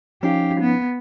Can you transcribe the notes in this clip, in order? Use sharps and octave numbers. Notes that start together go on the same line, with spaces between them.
F3 C#4 D#4 G4 F5
B3